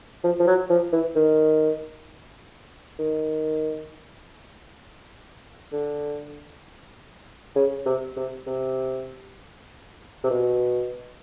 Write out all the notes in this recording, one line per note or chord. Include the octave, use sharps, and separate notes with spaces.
F3
F3
F#3
F3
E3
D#3
D#3
D3
C#3
C3
C3
C3
C3
B2